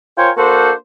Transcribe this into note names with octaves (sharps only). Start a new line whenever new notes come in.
F4 A#4 C5 C#5 G5 G#5
A#3 D4 F#4 A4 C5